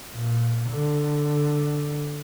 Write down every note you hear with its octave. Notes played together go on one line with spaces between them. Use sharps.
A#2
D3